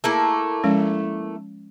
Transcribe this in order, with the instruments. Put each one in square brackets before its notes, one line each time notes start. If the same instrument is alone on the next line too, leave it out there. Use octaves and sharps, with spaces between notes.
[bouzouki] A3 A#3 E4 [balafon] G#4
[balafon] F3 G#3 C#4